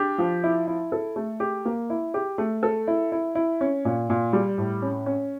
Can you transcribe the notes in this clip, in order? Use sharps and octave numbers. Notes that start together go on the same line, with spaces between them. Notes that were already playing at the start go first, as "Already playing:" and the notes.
Already playing: D4 G4
F3
E4
E4
A4
A3
G4
A#3
E4
G4
A3
A4
E4
E4
E4
C#4
A#2
A#2
G3
A2
C#4
C#4